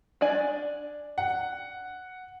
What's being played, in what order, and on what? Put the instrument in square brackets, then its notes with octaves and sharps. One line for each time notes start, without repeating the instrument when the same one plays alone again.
[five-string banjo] D4 D5 G#5
[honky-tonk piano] F#5